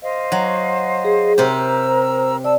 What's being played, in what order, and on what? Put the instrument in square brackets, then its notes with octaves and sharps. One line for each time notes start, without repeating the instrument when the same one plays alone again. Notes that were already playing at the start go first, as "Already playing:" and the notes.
[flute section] C5 D#5 F5
[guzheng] F#3
[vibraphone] G#4
[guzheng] C3 G4 [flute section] A#4 A#5 E6 [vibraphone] C5
[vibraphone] D5 [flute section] A5 E6